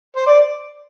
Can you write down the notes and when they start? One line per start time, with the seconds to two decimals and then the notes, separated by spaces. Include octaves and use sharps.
0.16 C5
0.27 D5